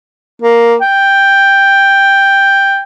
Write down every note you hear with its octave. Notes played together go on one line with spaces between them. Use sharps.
A#3
G5